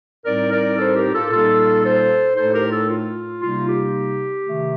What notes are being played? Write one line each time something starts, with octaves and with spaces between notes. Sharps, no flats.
A2 G3 C4 D#4 A#4 D5
A#4 D5
A4 C5
G4 A#4
F4 A4
A#2 G3 A#3 D#4 F4 A4
A4 C5
A2 A3 D#4 A4 C5
G4 A#4
F4 A4
F4
C3 G3 A#3 D#4 F4
G4
C3 D#3 A3